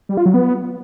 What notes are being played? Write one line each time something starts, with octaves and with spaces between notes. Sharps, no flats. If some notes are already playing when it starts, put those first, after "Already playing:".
G3
F4
F#3
B3